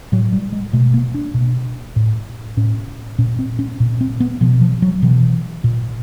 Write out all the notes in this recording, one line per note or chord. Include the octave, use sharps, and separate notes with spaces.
A2 F#3
G3
G#3
B2 A3
A#3
D4
B2
A2
A2 C#4
A#2 C#4
C4
C#4
A#2
C4
B3
B2 F3
F3
F#3
B2 E3
A#2